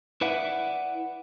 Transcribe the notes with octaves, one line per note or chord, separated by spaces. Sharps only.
E4 B4 D5 E5 F#5